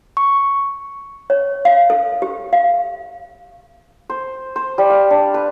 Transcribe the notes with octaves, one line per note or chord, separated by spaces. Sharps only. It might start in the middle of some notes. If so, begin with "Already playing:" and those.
C#6
C#5
F5
A4
G4
F5
C5
C5
G3
F5
D4
B4